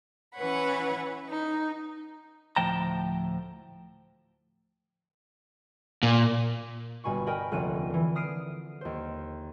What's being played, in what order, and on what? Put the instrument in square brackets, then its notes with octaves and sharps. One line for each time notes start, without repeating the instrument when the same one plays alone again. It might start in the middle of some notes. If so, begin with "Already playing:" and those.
[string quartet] E3 C#4 B4 C#5 F#5 B5
D#4
[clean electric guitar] D2 A2 F3 G5 A5 A#5
[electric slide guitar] A#2
[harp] G1 G2 B2 G#5 B5 C#6
A#4 D#5 G5 G#5 B5
F1 D#2 D3 C#4 F#6 D#7
D3 E3
D#6 F6 C7 D7 D#7
D#2 C5